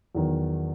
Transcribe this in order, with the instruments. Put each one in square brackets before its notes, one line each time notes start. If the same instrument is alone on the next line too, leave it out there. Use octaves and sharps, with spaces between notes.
[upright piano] E2 D#3 F#3